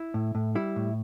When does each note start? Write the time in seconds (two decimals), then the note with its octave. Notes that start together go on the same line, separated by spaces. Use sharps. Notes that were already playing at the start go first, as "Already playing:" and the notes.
Already playing: E4
0.14 A2
0.35 A2
0.55 G3 E4
0.76 A2